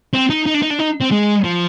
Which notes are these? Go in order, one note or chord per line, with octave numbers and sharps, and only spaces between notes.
C4
D#4
D#4
D4
D#4
D4
D#4
C4
G#3
F3